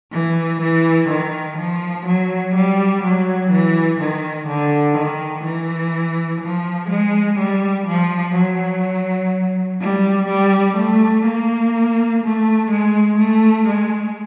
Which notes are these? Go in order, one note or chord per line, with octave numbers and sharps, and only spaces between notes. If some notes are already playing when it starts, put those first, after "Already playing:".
E3
E3
D#3
F3
F#3
G3
F#3
E3
D#3
D3
D#3
E3
F3
G#3
G3
F3
F#3
G3
G3
A3
A#3
A3
G#3
A3
G#3